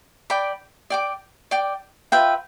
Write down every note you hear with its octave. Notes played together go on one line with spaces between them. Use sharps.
D5 G5 B5 D6
D5 G5 D6
D5 G5 D6
F4 B4 E5 G5